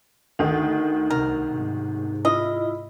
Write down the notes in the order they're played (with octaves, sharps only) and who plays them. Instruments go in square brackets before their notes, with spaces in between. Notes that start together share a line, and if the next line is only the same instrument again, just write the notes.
[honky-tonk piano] D2 D#3 [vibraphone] D#4
[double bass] C2 C3 [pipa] A#4
[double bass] G#2 C3
[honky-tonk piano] E4 [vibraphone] F4 [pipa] D#5